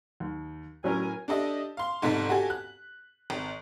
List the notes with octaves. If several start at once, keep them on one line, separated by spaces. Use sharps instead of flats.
D#2
A2 F#3 C#4 A#4 G#5
D4 G4 A4 D#5 E5
F5 C6
G1 G#2 C3 A4 B6
F#4 G4 A4 G#5
F#6
G#1